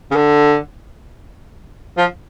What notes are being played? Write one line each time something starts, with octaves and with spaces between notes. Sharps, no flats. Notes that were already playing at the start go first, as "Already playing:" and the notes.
C#3
D3
F3